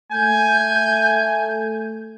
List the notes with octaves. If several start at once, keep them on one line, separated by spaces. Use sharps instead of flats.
A3 G#5 G6